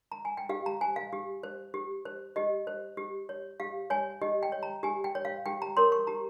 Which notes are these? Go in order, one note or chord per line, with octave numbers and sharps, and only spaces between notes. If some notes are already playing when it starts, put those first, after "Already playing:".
A#5
G#5
G5
G4 F5
A#5
C5 G#5
F5
G4
C5
G4
C5
G4 D#5
C5
G4
C#5
G4 F5
C#5 G#5
G4 D#5
G5
C#5
A#5
G4 G#5
G5
C#5
F5
G4 G5
A#5
A#4 C#5 C6
C#6
G4 A#5